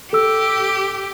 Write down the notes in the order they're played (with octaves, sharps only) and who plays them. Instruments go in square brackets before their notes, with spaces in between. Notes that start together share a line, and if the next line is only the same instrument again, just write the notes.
[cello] G4 [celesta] A4 E6